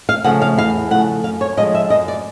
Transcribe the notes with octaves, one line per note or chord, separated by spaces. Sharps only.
F5
C#3 F3 A3 F#5
F5
E2 F5
C#3 F3 A3 F#5
F#2 F5
C#5
D3 F3 G#3 D#5
E5
F#2 D#5
D5